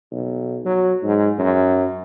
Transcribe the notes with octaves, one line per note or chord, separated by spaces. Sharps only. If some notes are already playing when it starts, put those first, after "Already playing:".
B1
F#3
G#2
F#2